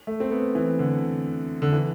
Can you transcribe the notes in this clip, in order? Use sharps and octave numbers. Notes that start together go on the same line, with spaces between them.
A3
C4
B3
E3
D3
D3
E3